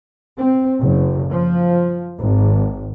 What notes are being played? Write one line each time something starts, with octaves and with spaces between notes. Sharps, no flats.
C4
F#1
F3
G#1